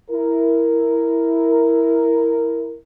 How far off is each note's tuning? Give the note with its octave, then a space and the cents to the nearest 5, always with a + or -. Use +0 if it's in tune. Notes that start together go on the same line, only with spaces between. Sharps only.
E4 +0 A#4 +0